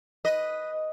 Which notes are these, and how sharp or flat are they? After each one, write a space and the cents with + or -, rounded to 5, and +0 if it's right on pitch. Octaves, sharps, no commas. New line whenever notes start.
B4 +0 D#5 +0